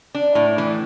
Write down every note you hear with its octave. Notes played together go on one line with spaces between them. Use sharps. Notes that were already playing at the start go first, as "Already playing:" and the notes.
D4
A2
E3